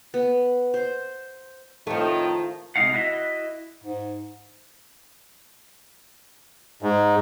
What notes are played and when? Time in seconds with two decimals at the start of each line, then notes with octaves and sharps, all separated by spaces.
0.14 B3
0.74 C5
1.87 F2 A2 D#3 F3 A3
2.76 C3 G#3 B3 D#4 F5 F#5
2.93 E4 F#4 D#5 E5
3.84 G#2
6.82 G#2